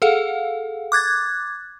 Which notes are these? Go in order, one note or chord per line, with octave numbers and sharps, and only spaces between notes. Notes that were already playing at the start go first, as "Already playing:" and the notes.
G#4 A4 F5 F#5
D6 F#6 G#6 A6